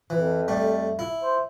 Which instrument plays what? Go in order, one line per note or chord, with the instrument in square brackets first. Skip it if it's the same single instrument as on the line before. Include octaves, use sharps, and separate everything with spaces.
[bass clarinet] F2 [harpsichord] E3
[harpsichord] G3 A3
E4
[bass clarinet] C5